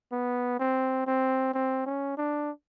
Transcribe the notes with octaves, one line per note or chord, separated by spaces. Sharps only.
B3
C4
C4
C4
C#4
D4